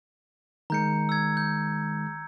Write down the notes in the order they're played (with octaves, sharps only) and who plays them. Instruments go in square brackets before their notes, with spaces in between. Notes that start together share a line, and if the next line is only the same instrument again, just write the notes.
[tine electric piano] D#3 G#3 [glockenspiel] A#5 G6 C#7
[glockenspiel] E6 G#6
G6